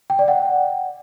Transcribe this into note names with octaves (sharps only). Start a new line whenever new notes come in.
G5
D5
F#5